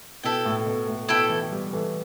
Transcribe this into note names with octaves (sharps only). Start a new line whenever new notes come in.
B2 E4 A4 G5
A2
B2
A2
B2 E4 A4 G5
E3 A3
G3 B3
E3 A3